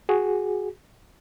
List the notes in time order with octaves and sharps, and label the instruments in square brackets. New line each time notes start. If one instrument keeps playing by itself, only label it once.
[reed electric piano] F#4 G#4